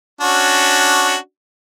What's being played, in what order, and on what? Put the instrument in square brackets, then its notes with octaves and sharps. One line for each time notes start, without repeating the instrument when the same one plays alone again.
[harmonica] C#4 D4 F#4